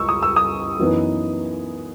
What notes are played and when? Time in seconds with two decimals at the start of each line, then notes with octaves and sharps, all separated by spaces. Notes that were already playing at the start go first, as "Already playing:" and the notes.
Already playing: C#2 C#6 E6
0.09 D#6
0.23 E6
0.36 D#6
0.79 F#2 E3 B3 D#4